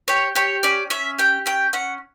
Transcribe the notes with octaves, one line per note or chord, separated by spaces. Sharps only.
G4 C#5
G4 C#5
C#4 D5
C#4 E5
G4 G5
C#4 G5
C#4 F#5